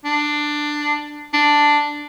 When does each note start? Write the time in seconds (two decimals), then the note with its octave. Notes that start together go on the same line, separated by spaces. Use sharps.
0.05 D4
1.34 D4